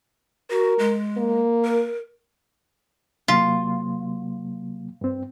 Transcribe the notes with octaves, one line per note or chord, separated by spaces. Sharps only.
F#4 A#4
G#3
A#3
A#4
C3 F#3 A#3 F4
G2 C4